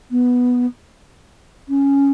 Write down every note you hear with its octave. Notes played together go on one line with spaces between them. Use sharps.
B3
C#4